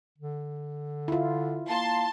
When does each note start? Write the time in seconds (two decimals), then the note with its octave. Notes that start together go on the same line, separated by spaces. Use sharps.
0.18 D3
1.08 E4 F4
1.69 A#3 A5 C6